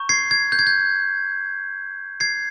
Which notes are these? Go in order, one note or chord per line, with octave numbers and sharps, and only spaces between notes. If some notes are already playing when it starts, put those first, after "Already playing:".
Already playing: A#5 C#6 G6
G#6 C7
G#6
G6
G#6
G6
G#6 C7